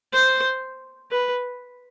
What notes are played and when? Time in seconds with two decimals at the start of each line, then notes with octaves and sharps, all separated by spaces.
0.14 C5
1.11 B4